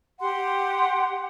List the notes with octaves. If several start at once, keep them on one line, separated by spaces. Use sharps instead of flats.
G4 F#5 C6